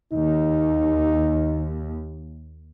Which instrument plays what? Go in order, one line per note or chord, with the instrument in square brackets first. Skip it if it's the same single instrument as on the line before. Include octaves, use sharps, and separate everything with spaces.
[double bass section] D#2 [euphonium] D#4